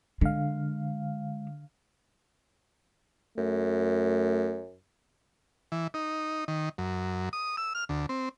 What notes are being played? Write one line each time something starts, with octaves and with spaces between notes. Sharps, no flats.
D3 G#3 F5
F#2 A3
E3
D#4
D#3
F#2
D#6
E6
F6
D2
C4